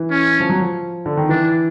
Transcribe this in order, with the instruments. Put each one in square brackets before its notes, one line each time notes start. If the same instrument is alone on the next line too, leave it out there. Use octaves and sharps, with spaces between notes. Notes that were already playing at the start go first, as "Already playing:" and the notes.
Already playing: [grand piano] E3
[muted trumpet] C#4
[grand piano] F3
F#3
F3
D3
D#3
[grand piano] E3 [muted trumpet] D4